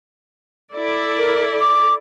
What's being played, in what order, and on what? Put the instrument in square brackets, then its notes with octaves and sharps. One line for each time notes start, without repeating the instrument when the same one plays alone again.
[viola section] E4 A4 D5
[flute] A#4
D6